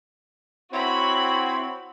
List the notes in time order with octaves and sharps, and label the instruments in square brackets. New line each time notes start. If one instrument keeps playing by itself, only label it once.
[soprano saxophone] C4 [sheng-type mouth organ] E4 C#5 [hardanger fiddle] F#4 [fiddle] B5